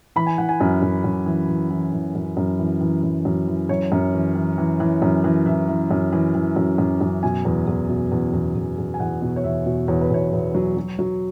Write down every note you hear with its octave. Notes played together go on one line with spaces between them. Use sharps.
E3 B5
G#5
E3 F#5
G#5
F#2
F#2
F#2
E3
E3
E3
E3
F#2
F#2
E3
E3
F#2
F#2
E3
F#2 C#5
F#2
E3
E3
E3
E3
F#2
E3
E3 E5
E3
F#2
E3
E3
F#2
F#2
F#2
B2 G#5
E2
E2
B2
E2
E2
E2
E2
G#5
E2 F#5
B2
C#5
E2 E5
B2
E2 C#5
B4
E2 C#5
E2
F#3
F#3
F#3